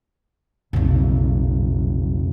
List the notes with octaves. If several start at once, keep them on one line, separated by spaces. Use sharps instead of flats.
F1 B1 F2 C#3